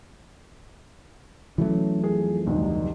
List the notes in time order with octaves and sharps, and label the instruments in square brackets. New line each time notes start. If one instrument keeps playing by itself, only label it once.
[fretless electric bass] E3 F#3 A3 [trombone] C#4
[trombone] F2 [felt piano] G#4
[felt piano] F1 D2 G2 [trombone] D#4